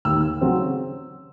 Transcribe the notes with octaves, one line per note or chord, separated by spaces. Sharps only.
D#2 E6
C#3 F#3 C4